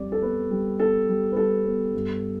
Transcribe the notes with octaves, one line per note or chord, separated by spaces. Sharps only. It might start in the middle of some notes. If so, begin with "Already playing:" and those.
Already playing: F2 G3 D5
A4
B3 B4
G3
B3 A4
G3
B4
G3 A4
B3
G2